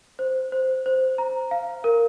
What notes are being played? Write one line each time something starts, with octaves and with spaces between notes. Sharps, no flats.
C5
C5
C5
A#5
F5
A#4